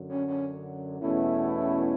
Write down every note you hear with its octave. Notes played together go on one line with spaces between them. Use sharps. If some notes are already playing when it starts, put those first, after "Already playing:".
Already playing: F#2 D3 F#3
C#4
C#4
E2 B2 A3 C#4 E4
C#4